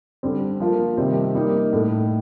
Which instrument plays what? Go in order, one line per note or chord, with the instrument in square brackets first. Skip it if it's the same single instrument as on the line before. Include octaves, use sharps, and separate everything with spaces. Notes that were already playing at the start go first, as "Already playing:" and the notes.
[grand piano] D3 G3 C4
F3 A#3 F4 A#4
C3 D#3 G3 C4 G4
G3 A#3 D#4
A2 A3 D#4